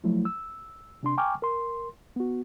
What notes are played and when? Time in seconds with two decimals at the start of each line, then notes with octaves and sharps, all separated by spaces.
0.04 F3 F#3 A3 E4
0.25 E6
1.03 C3 D4 C6
1.18 G5 G#5 A#5 C#6 D6 F6
1.42 A#4 C6
2.16 B3 F#4